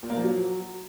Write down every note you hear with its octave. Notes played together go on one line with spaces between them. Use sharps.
A#2
A#3
F3
F#3